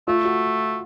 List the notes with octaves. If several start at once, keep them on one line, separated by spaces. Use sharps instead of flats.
A3 F4
F#4